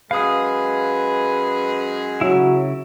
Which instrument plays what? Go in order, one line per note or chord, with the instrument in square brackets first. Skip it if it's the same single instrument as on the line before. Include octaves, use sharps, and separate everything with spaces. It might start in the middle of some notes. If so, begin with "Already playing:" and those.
[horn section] F#2 G#3 G#4 [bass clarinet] B4 [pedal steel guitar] F5 D#6
[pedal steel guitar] C#3 E4 [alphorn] F#3